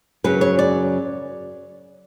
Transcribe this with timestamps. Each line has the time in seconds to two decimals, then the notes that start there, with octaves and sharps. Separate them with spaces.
0.24 F#2 C#3 F#3 B4
0.41 C#5
0.59 D5